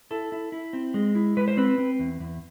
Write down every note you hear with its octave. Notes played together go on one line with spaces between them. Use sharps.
E4 A4
E4
E4
C4
G#3
E4
G#3 B4
C5
C4 B4
C4
E2
E2